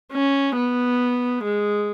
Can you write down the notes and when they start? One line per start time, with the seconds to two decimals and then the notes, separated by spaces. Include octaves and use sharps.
0.13 C#4
0.56 B3
1.43 G#3